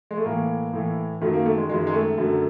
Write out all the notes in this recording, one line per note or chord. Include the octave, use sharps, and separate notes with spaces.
G#3
A3
A2 E3 A#3
A2 E3
F#2 D#3 F#3 A3
A#3
A3
G#3
F#2 D#3 F#3 G#3
G#3
A3
F#2 D3 F#3